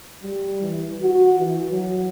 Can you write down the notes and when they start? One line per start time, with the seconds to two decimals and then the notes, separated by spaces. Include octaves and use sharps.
0.23 G3
0.62 E3
1.02 F#4
1.39 E3
1.72 F#3